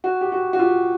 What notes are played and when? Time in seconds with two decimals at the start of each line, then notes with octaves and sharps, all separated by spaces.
0.04 F#4
0.21 G4
0.32 F#4
0.53 F#4
0.59 F4 G4